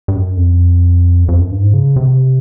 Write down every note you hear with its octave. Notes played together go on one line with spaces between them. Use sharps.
G2
F#2
F2
F2
F#2
G2
G#2
C#3
C3